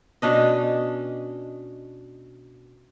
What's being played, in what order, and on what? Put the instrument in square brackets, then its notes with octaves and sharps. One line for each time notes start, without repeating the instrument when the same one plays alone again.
[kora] B2 C#4 D4 D#5